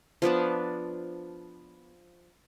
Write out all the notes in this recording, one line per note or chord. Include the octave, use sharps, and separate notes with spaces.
F3 B3 D4 A5